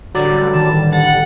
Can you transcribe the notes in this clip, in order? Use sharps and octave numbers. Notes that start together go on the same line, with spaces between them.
A1 D3 F#3 G3 D5
D#3 A5
F#5 A6